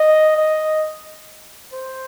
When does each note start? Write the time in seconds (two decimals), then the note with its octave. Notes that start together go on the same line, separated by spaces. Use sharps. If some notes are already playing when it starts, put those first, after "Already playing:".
Already playing: D#5
0.36 D#5
1.74 C5